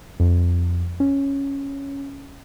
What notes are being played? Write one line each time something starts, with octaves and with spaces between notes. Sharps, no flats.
F2
C#4